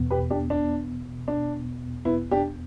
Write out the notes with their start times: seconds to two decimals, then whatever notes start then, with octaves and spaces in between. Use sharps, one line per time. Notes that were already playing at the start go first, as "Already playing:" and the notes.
Already playing: E2 B2 B3
0.11 G4 B4
0.30 D4 G4
0.50 D4
1.28 D4
2.05 B3 E4
2.31 D4 G4